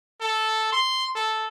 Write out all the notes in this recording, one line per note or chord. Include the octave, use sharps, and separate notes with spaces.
A4
C6
A4